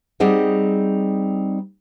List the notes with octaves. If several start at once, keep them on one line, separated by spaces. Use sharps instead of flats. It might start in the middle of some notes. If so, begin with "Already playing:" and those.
G3 C4 D#4 G#4 F#5